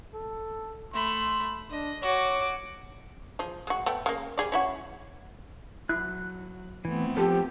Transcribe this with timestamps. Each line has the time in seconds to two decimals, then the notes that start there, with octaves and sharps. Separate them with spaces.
0.14 A4
0.94 A3 B5 C6
1.71 D4 D#5
2.02 F#4 C#5 D6
3.39 F3 G#4
3.67 G#3 F#4
3.86 A3 B3 G5
4.06 C#3 A#3
4.38 G3 G#4 D5
4.52 C#4 E4 F#4
5.89 F#3 E4 F#6
6.85 E3 A3 B3 C4
7.17 F3 G4 A4